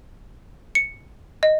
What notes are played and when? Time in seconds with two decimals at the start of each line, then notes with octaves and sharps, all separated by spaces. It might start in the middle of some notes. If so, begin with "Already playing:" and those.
0.75 C#7
1.43 D#5